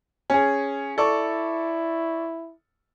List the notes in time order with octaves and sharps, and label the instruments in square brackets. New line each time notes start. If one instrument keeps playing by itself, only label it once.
[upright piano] C#4 G#4
[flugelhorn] E4 [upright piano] A4 D5 C#6